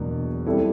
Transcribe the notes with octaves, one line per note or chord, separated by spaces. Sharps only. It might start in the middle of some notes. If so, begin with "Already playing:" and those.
Already playing: E2 B2 F#3 A#3 D4
G3 C4 E4 A4